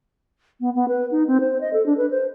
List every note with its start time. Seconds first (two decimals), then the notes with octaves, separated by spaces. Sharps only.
0.61 B3
0.75 B3
0.88 B4
1.11 D#4
1.27 C4
1.40 C5
1.61 D#5
1.73 A4
1.86 D4
1.97 B4
2.11 C5